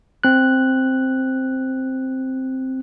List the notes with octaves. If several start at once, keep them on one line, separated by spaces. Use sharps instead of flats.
C4 F#6